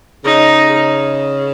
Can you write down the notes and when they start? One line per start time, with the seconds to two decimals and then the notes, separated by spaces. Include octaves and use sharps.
0.24 C#3 D#4
0.69 C#3